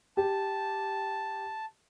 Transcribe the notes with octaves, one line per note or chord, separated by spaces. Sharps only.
G4 A5